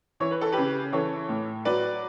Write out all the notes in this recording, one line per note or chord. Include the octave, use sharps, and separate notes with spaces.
E3 C#5
B4
A4
C#3 G4 B4
E3 A4 C#5
A2
F#3 B4 D5